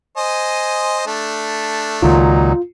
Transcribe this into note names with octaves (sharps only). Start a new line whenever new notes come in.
C5 D#5 G#5
A3 D4
C#2 A#2 D#3 F#3 D#4 F4